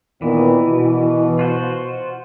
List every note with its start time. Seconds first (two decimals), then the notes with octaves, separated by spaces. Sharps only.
0.22 A#2 D#3 E3 B3
0.69 B2
1.39 F4 F#4 C5